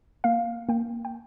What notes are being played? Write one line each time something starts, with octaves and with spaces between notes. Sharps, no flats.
A#3 F5
A#3 G5
G5